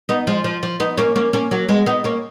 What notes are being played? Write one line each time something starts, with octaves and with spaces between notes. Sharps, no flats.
B3 D#4
F3 G#3
F3
F3
B3 D#4
A#3 C#4
A#3 C#4
A#3 C#4
F#3 A#3
G#3 B3
B3 D#4
A#3 C#4